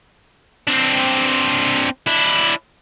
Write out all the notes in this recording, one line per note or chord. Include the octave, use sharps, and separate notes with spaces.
C4 D4
D4 E4